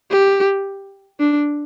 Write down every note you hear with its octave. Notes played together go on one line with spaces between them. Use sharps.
G4
D4